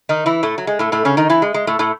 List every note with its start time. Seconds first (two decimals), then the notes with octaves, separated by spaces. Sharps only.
0.09 D#3 D#4
0.26 E3 E4
0.43 A2 A3
0.58 F#3
0.67 G#3
0.79 A2 A3
0.92 A2 A3
1.05 C#3 C#4
1.17 D#3 D#4
1.30 E3 E4
1.42 G#3
1.54 G#3
1.67 A2 A3
1.79 A2 A3